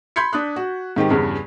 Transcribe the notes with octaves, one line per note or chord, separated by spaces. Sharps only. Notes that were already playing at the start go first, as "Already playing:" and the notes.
B5 C6 G6 G#6 B6 C#7
D4 D#6 F#6
F#4
G#2 D#3 C4 G4
E2 G2 C#3